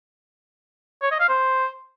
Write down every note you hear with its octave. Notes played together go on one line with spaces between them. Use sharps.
C#5
D#5
F5
C5